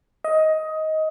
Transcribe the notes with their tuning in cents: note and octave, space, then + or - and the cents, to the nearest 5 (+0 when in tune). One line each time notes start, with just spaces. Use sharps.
D#5 +15